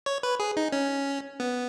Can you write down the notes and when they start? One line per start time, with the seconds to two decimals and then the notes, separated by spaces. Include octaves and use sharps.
0.06 C#5
0.23 B4
0.40 G#4
0.57 D#4
0.72 C#4
1.40 B3